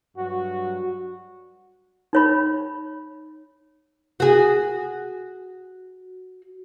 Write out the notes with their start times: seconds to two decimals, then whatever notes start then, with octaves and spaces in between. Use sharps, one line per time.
0.16 G2 F#3 F#4
2.13 D#4 C#5 B5
4.20 F#4 G#4